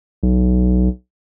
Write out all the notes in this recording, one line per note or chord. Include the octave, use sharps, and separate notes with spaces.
B1